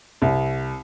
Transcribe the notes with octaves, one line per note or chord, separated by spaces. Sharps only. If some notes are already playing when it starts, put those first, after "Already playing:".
C2